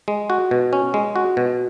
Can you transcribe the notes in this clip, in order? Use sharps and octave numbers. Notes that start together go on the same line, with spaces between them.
G#3
F#4
B2
C#4
G#3
F#4
B2